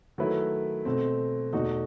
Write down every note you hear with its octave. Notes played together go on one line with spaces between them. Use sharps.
D#3 F#3 A3 E4 B4
B2 A3 C4
E2 B2 A3 D#4 F#4